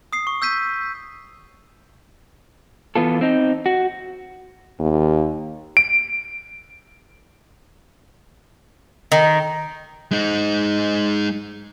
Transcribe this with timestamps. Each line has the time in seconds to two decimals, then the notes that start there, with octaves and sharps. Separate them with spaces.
0.13 D#6 C7
0.27 C#6
0.42 E6 G6 B6 D#7
2.96 E3 B3 F4 A4
3.21 C4 D#4
3.66 F#4
4.79 D#2
5.77 D7
9.12 D#3
10.11 G#3 D#4